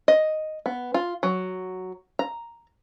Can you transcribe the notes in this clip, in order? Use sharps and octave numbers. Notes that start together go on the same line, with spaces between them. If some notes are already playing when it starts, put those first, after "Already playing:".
D#5
B3
F4
F#3
A#5